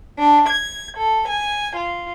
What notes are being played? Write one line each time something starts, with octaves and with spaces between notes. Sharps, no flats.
D4
G#6
A4
G#5
F4